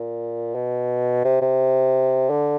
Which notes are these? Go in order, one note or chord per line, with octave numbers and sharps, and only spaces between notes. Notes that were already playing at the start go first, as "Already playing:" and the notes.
Already playing: A#2
B2
C3
C3
D3